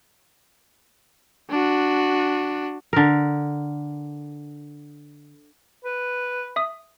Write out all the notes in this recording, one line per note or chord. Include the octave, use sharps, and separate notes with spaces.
D4 F#4
D3 A#4
B4
E5 D#6